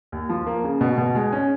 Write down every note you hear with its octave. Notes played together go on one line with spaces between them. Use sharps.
D#2
F3
A#3
C#3
B2
B2
G#3
C#4